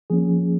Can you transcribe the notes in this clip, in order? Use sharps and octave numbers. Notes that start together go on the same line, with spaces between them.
F3 A#3 C#4 G#4